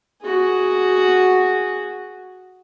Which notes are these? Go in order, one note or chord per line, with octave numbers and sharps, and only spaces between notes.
F#4 G#4